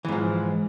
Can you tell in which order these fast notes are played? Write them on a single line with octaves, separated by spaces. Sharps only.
E3 G#2 F3